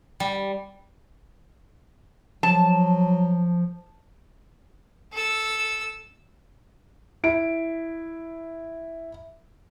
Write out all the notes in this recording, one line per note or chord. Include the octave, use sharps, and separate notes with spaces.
G3
F3 F#3 A5
A4 E6
E4 D7